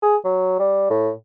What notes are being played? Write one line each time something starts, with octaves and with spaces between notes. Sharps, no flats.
G#4
F#3
G3
A2